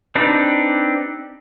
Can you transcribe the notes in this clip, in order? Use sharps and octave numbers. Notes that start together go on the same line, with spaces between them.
C4 D4 D#4 G4 B4